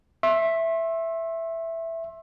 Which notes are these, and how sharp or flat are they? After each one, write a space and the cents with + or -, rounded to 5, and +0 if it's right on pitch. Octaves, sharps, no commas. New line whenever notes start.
E5 +0 C6 +40